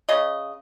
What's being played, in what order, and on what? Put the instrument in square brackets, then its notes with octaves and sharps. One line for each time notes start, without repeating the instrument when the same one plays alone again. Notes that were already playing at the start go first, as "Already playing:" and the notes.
[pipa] C#3 D#5